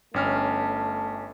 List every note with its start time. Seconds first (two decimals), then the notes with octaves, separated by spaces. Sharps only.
0.14 G1 A3 C#4 F6